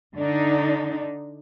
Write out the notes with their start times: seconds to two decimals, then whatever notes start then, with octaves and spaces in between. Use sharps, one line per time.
0.15 D3 D4 D#4